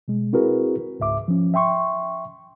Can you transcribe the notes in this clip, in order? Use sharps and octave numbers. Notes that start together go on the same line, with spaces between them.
B2 G#3
C4 E4 F#4 G#4 A#4 B4
C#2 G#2 E5 D6
F3 C#4
E5 G5 C6 C#6